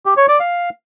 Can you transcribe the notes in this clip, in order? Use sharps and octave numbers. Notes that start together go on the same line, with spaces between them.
G4
C#5
D5
F5